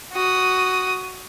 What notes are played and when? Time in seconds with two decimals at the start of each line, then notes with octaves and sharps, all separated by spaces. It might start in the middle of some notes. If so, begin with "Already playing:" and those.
0.13 F#4 D#6